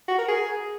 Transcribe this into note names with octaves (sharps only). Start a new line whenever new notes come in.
F#4
A#4
G#4